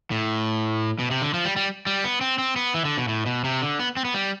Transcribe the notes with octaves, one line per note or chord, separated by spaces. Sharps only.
A2
B2
C3
D3
F3
G3
G3
G3
B3
C4
C4
B3
E3
D3
B2
A2
B2
C3
D3
B3
C4
B3
G3